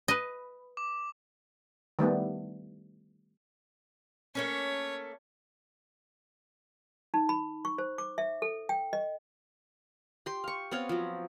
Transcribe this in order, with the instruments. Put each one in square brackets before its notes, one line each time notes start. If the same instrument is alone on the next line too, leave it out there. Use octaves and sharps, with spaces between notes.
[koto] B4 D#5
[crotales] D6
[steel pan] D#3 G3 A3 B3
[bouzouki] A3 A#3 C#4 [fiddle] C#5
[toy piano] D#4
B5
C#6
C5
D6
E5
A4
G5
D#5
[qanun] G4 C6
F5 C#6
B3 C4 C#5 F5
F3 F#3